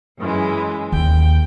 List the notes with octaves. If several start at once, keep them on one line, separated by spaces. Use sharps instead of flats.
F#2 E3 G#3
D#2 G5